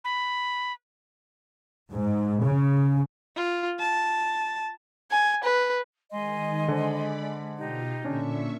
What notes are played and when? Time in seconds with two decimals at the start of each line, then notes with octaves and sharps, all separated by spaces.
0.05 B5
1.91 G#2
2.44 C#3
3.36 F4
3.79 A5
5.11 G#5
5.44 B4
6.12 D#3 G#3 D#5 G#5 C6
6.68 D3 C5 D5 B5
7.58 B2 D#4 F4 G4
8.05 A#2 D3 C#4 D4 E5 C#6